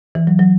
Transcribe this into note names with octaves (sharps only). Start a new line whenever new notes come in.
E3
F#3
F#3